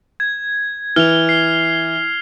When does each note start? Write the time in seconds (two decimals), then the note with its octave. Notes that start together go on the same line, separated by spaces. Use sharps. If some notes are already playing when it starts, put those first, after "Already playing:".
0.20 G#6
0.96 E3 F6 F7
1.29 C7